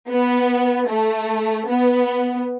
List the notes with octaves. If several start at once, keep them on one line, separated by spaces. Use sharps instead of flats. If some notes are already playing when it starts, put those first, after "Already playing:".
B3
A3
B3